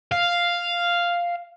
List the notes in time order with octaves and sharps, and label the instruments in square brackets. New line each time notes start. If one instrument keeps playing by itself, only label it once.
[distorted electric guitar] F5